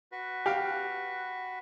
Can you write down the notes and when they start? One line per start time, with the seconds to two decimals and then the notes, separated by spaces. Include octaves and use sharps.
0.12 F#4 B4
0.46 G4 F5